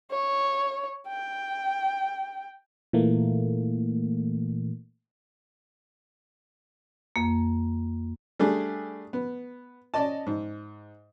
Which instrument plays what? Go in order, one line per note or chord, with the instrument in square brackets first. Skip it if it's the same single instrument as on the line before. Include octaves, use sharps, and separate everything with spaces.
[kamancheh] C#5
G5
[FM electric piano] A#2 E3 A3 A#3
[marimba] F2 A#3
[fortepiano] G3 A3 D4 G#4
B3
C#4 D5 D#5 A5
G#2